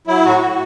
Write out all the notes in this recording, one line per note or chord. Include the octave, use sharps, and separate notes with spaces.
F#3 E4
A2 F#4
A2